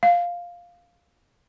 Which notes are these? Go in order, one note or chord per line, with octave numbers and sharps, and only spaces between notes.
F5